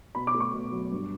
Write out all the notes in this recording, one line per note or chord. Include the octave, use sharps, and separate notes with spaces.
B2 B5
D6
A3
C#6
B2
F#3
G2